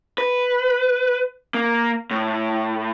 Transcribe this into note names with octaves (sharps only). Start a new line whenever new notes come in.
B4
A#3
A2